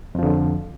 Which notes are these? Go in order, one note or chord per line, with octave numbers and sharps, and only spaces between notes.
F2 D3 F3